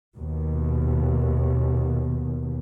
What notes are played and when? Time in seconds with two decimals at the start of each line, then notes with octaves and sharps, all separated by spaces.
0.17 D#2 B2